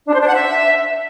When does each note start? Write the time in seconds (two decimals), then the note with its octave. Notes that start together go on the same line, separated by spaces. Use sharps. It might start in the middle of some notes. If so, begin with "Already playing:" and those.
0.06 D4
0.13 C5
0.20 D4
0.27 F#5
0.33 E5